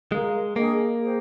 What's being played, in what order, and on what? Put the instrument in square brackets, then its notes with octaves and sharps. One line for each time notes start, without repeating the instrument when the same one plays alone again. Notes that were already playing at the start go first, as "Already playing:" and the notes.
[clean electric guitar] G#3 [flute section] A#4 F5 A#5
[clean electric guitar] A#3 [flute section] D4 G#4 D#5 G5
[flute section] G#4 C5 G5